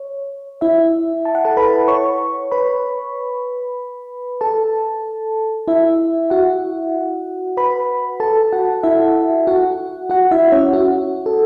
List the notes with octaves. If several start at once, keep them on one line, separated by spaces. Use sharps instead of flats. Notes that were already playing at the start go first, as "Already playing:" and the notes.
Already playing: C#5
E4 E5
A5
F#5
A4 A5
B4 B5
C#5 C#6
B4 B5
A4 A5
E4 E5
F#4 F#5
B4 B5
A4 A5
F#4 F#5
E4 E5
F#4 F#5
F#4 F#5
E4 E5
C#4 C#5
F#4
A4